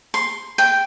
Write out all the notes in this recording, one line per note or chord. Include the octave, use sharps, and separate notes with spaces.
C6
G5